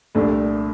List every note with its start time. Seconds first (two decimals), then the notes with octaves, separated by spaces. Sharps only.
0.15 C2 A#2 A3 D4